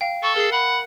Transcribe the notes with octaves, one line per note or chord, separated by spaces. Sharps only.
F5 G5
A4 C#6
G#4 A#4 C7
F#5 B5